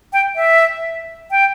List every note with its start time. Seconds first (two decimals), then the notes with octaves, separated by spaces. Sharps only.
0.13 G5
0.36 E5
1.31 G5